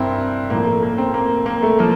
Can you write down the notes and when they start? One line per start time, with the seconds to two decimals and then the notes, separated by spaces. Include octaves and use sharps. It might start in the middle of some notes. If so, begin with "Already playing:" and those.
Already playing: G2 C4 E4 A#4
0.50 A2 F3 A#3
0.67 A3
0.82 A#3
0.98 C4
1.14 A#3
1.46 A#3
1.63 A3
1.79 F3 A#3